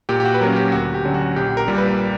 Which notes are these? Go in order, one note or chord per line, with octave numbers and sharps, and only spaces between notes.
A#2 G4
G4
F#4
B4
F#3 A#3 C#4 A#4
G4
D2 F#4
G4
D3 F#3 C#4
F#4
A#1 G4
A#4
A#2 G3
B4